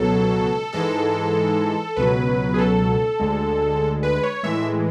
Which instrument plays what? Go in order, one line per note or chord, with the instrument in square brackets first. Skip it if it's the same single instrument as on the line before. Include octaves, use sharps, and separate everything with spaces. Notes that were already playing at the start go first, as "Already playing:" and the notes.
Already playing: [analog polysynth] C#2 B2 F#3 A4
G#2 E3 G#3 A4
C#2 B2 F#3 B4
G#4
A4
D2 D3 G#3
B4
C#5
A2 E3 G#3 E5